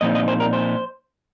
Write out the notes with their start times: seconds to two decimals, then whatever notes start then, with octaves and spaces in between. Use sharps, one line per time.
0.01 A#2 F3 C4 D#4 D#5
0.15 D#5
0.28 C5
0.40 A#4
0.53 C5